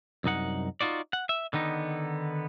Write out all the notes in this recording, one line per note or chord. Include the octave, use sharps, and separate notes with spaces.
C2 F#2 D#4 F#5
D#4 F4 F#4 D5
F#5
E5
D3 D#3 B3 D#4